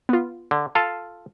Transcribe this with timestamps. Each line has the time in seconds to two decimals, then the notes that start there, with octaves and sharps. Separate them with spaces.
0.09 B3 F4
0.51 D3
0.75 F4 A4 F5 A5